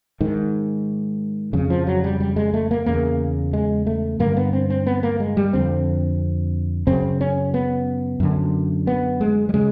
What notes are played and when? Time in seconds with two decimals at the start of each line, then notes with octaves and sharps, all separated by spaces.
0.21 G#2 D#3
1.53 F2 C#3
1.70 F3
1.87 F#3
2.04 G3
2.20 G3
2.36 G#3
2.54 A3
2.71 A#3
2.86 E2 C#3 A#3
3.53 G#3
3.87 A3
4.20 G2 D3 A#3
4.37 B3
4.53 C4
4.70 C4
4.87 B3
5.03 A#3
5.20 G#3
5.37 G3
5.53 F2 D3 C4
6.87 F#2 C#3 C4
7.21 C#4
7.54 B3
8.20 F#2 D3
8.87 B3
9.21 G#3
9.49 G3
9.54 C#3 G#3